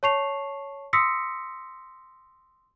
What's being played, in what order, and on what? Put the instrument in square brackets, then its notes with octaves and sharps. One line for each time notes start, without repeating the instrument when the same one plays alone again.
[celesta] C#5 A5 C#6 C7 F7
C6 D#6 E6 A#6 B6 C#7